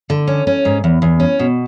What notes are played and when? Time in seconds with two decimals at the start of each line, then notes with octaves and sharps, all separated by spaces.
0.10 D3
0.27 C#4
0.47 C#4
0.65 G#2
0.84 E2
1.02 E2
1.20 C#4
1.39 B2